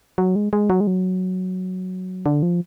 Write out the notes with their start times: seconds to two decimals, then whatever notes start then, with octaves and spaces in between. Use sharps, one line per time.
0.18 F#3
0.36 G#3
0.53 G#3
0.70 F#3
0.81 G#3
0.87 F#3
2.26 D3
2.43 F3